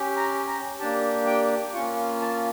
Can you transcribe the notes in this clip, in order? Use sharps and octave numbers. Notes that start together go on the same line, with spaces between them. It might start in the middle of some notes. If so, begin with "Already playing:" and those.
Already playing: C#4 G4
A#5
A#5
A#3 D4 G4 A5
G5
A#3 C#4 F4 C#6
A5